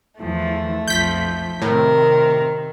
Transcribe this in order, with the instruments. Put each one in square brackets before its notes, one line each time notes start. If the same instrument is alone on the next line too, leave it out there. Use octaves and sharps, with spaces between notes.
[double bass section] E2 E3 [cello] F3 [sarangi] A3
[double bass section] B1 F2 [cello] F3 [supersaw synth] G6 B6
[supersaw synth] A2 [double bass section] C3 C4 [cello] D#3 [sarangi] A#4